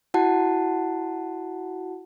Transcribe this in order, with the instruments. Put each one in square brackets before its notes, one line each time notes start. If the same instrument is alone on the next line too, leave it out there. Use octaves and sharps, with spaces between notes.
[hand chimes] E4 F#4 F#5 A5